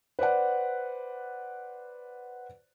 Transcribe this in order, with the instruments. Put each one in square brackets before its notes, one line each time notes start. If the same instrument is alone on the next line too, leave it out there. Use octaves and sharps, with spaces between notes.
[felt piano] B4 C5 D5 F#5